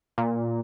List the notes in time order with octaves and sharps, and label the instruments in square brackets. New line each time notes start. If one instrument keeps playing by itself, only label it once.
[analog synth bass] A#2